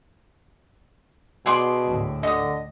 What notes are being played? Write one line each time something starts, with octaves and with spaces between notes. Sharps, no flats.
B2 G#4 D5 C6
D2 A2
D3 D#5 D#6